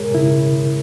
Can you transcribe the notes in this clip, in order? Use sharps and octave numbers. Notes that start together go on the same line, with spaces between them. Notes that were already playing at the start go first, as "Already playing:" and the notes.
Already playing: E2 C#3 G#3 G#4 A#4 C#5
C#3 E4